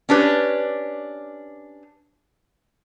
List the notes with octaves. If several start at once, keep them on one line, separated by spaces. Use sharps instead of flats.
C#4 D4 G4 B4 C#5